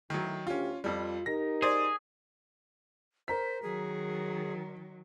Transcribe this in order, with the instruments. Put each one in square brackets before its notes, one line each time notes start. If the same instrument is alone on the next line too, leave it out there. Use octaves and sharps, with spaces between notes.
[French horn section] D2 E4 [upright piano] D#3 F#3
[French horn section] D2 G4 [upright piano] C#4 F4
[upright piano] F2 G3 [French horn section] F4
[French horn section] D#4 G4 A#4 [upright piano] A#6
[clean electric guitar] G#4 [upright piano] C5 D5
[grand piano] A#4 A#5 B6 [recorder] C5
[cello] D#3 F#3 [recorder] G#4